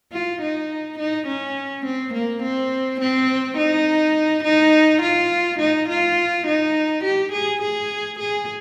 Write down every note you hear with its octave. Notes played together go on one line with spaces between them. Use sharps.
F4
D#4
D#4
C#4
C4
A#3
C4
C4
D#4
D#4
F4
D#4
F4
D#4
G4
G#4
G#4
G#4